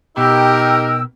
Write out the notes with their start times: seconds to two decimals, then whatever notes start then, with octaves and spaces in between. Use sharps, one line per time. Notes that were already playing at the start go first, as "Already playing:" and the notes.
0.17 B2 D#4 G4 A#4 G5 E6